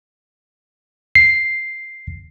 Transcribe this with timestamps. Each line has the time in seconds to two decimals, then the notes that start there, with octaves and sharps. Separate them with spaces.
1.15 C7